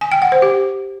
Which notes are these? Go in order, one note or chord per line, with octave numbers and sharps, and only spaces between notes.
G#5
G5
F#5
C5
G4